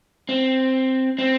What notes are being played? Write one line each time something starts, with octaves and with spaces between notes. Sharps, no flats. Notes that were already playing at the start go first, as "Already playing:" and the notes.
C4
C4